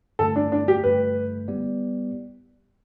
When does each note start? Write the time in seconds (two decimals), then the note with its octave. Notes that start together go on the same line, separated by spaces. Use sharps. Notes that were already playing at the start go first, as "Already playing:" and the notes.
0.19 G2 D3 A3 A4
0.36 D4
0.52 D4
0.68 G4
0.84 G2 D3 A3 B4
1.48 G3 B3 E4 G4 D5